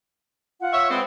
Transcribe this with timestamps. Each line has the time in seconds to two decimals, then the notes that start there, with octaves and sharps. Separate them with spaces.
0.61 F4 F#5
0.73 C#5 E5
0.91 G#3 B3 C4